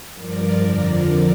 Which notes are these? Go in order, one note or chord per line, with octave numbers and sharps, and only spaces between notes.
G2 F3 A#4 D5
F2 D3 F3 A#4 D5